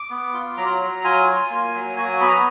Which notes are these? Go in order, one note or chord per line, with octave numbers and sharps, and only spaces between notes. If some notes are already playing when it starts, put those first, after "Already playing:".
Already playing: D6
B3
F4
F#3 A#5
F#3
F4 G#5
F4
A#3
F#3
F#4 G#5
G#5
B3 B5
A#5